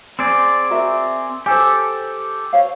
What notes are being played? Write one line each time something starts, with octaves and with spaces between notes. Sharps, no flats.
C4 G#4 D5
F#4 A#4 E5
G4 A4 C5 G#5
C5 C#5 F5